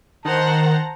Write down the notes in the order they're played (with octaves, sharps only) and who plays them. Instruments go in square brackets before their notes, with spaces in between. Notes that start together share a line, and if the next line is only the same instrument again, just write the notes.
[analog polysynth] D#3 [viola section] C5 F#5 A#5 [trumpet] A5